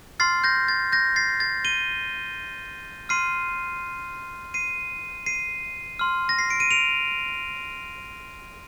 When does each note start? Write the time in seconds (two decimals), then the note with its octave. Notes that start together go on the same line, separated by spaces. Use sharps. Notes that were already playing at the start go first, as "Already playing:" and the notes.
0.20 C6 F6 A6 C7
0.44 G6 A#6
0.68 A6
0.92 G6 A#6
1.16 A6 C7
1.40 A6
1.65 D#7 G7
3.09 C6 F6 C7 D#7
4.54 C7 D#7
5.26 C7 D#7
5.99 C6 F6
6.29 A#6
6.39 C7
6.50 D7
6.60 D#7
6.71 D7 F7